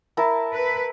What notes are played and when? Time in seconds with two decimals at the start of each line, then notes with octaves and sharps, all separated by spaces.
0.17 E4 A#4 A5
0.53 B4